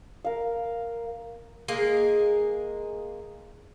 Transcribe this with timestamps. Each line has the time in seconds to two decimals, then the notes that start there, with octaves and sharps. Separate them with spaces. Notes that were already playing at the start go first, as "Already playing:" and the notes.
0.25 A#4 F5
1.68 G#3 A#3 G#4